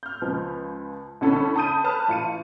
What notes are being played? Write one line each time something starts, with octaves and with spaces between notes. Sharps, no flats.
F6 G6
C#2 F3
C2 D3 C#4 A4 C#5 B5
A5 B5 D#6 G6 D#7
B4 C#5 A5 B5 F6
A1 F4 C#7 D#7